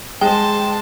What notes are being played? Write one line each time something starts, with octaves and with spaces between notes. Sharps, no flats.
G#3 C5 G5 A5